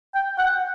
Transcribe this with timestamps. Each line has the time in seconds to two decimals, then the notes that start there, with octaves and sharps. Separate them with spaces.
0.15 G5
0.38 F#5